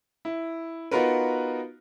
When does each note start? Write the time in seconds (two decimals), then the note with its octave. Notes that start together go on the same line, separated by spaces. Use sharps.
0.25 E4
0.91 B3 D#4 F4 F#4 A#4 B4